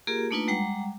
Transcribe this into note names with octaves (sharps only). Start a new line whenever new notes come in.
A#3 F4 G4 G#4 A#4
A3 A#3 D4 D#4 F4 B4
G3 G#3 F#5 G5 A#5 D6